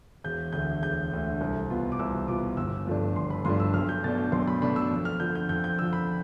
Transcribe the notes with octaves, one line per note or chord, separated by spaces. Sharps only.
E1 G6
D2 D3 A3 G6
E1 G6
D2 D3 A3
C2
B2 B3 F4
D6
C2 E6
B2 B3 F4 D6
G1 E6
G2 F3 A3 D4
G1 C6
B5
G2 F3 A3 D4 C6
E6
B1 F6
G6
B2 A3 D4 A6
G6
B1 C6
B5
B2 A3 D4 B5
E6
F2
F6
D3 F3 G6
G6
F2 G6
G6
D3 F3 E6
B5